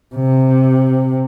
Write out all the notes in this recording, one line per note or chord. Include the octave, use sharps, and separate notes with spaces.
C3